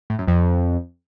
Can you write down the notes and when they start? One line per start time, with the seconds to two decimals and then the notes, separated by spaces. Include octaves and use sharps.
0.10 A2
0.19 F#2
0.28 F2